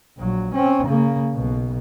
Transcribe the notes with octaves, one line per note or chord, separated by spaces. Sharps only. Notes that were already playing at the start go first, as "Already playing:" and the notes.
A#1 F#3
C4 C#4
C#3 A#3
B1 B2